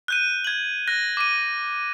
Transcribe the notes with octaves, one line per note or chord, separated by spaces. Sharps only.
F#6 G6 D#7
G#6 F#7
F#6 A#6
D6 D#7